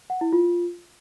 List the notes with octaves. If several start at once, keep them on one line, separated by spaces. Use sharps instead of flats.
F#5
E4
F4